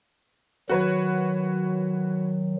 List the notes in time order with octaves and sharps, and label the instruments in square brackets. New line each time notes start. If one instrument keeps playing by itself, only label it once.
[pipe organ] D#3 F#3 [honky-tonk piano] F#4 B4 C#5